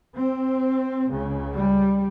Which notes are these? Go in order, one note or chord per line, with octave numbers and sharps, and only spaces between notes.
C4
C#2 C#3
G3